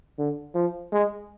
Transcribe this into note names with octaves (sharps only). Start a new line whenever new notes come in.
D3
F3
G#3